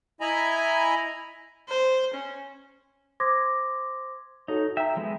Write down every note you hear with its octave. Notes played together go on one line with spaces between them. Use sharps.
E4 D#5 G#5 A#5 B5
C5
C#4
C5 C6 D6 D#6 G#6 A#6
D#4 F#4 A4 C#5
E5 G5 A#5
F3 G#3 B3